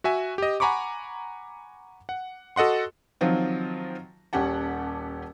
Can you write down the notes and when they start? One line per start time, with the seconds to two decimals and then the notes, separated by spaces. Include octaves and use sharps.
0.04 F#4 E5 G#5
0.38 G4 D#5
0.60 F#5 G#5 A#5 B5 C#6 D6
2.09 F#5
2.56 F#4 A4 D#5 F#5 C6
3.21 D#3 F3 F#3 C4 F4
4.33 D#1 C#4 G4 F#5 A5